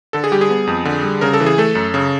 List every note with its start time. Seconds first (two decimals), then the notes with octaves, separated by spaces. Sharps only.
0.13 D3 A4
0.24 G#4
0.32 G3 G4
0.41 G#4
0.50 B3
0.67 F2
0.85 D3
1.03 G3
1.21 C#3 A#4
1.33 A4
1.40 E3
1.46 G#4
1.58 A3 A4
1.75 F#2
1.94 C#3